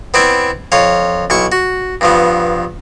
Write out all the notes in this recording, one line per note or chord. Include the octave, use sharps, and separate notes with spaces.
B3 C4 E4 D5 E5
F2 F4 C#5
B1 E4 C#6
F#4
G2 F3 B3